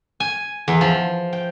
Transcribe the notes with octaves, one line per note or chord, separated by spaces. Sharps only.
G#5
E2
F3
G5